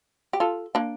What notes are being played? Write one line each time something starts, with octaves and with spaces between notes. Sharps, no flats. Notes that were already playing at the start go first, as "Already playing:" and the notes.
G4
F4 A4
A#3 D4